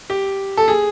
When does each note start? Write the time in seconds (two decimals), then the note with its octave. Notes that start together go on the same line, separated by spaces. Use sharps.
0.10 G4
0.57 A4
0.68 G#4